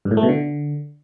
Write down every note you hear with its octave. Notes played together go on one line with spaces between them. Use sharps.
G2
A2
A3
B2
D3